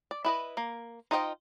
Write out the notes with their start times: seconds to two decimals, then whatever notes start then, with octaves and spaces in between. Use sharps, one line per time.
0.11 D5
0.25 E4 B4 D#5
0.57 A#3
1.11 D#4 F4 C5 D#5 G5